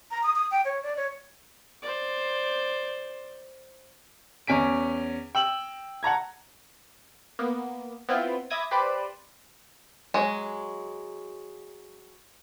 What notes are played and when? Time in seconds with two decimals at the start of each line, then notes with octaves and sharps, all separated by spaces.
0.11 A#5
0.23 D#6
0.36 D#6
0.51 G5
0.65 C#5
0.83 D5
0.96 C#5
1.82 C5 D5
4.47 E2 C#4 G#5 B6 D7
5.35 G5 E6 F#7
6.03 F#5 A5 A#5 G#6
7.39 A#3 B3
8.09 B3 C4 E4 F4
8.50 E5 B5 D6 D#6 G#6 A#6
8.71 G4 B4 C5 D5 B5
10.14 F#3 G#3